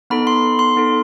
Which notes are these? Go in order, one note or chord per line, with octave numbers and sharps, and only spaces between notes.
B3 D#4 A4 B5
C6
C6
B3 D#4 A4